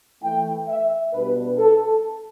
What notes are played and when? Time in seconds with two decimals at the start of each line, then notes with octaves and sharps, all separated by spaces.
0.22 E3 A3 E4 G5
0.68 E5
1.13 B2 G3 D4 B4
1.58 A4